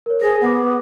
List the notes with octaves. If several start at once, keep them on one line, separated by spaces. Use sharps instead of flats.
A#4 C#5
G#4 C5 A#6
B3 F#5 D6